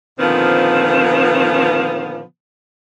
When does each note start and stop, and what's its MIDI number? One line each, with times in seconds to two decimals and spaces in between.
0.20 2.20 46
0.20 2.20 50
0.20 2.20 51
0.20 2.20 53
0.20 2.20 59
0.20 2.20 60